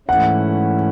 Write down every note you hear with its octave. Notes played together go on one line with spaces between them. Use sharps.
G#2 E3 A3 C#4 E4 F#5